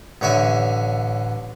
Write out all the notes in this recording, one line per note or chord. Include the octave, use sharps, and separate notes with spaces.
A1 D3 C#5 E5 G#5